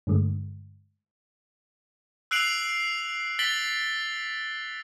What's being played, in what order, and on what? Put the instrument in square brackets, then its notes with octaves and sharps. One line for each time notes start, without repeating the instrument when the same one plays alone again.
[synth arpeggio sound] G2 D3 G#3 A3
[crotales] E6 F#6 C7 D7 F7 F#7
A6 B6 D7 F#7 G7